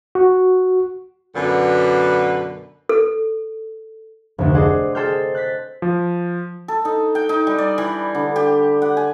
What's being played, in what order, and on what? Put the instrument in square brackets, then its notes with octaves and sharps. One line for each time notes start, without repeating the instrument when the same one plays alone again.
[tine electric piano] F#4
[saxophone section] F#2 B2 D3 B4
[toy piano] A4
[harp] F1 D2
G#4 C5 D5 D#5 F#5
G#4 A4 C5 G5 F6 G6
F#6 G6 A6 B6
[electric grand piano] F3
[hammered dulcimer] A4
D#4
G5
D#4
G3
D5
E3
D3
G4
F#5
G#5